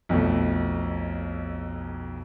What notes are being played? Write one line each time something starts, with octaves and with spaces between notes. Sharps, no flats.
B1 F2 B2 A3